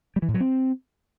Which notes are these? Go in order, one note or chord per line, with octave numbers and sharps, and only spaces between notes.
G3
E3
A2
F#3
C4